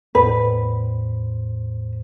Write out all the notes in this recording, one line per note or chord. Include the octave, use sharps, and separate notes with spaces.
E2 A2 B4 C5